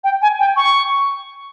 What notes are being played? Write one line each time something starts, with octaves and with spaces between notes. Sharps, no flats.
G5
G#5
G5
C#6